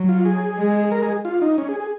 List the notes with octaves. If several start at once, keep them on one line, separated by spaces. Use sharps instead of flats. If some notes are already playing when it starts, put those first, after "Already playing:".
Already playing: F#3
F4
G#4
G#3
A#4
G#4
F4
D#4
C#4
G#4
G#4